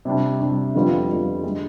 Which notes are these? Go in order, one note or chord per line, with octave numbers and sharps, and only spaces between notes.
C3 G3 D4
C3 G3 D4
F2 D3 G3 B3 F4
F2 D3 G3 B3 F4
D3 G#3